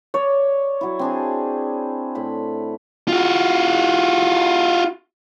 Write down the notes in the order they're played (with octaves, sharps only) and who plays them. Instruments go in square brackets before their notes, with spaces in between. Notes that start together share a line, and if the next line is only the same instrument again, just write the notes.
[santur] C#5 [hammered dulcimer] D5
[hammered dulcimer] F#3 E4
C4 D4 G#4
A2 A3 B5
[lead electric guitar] F4 F#4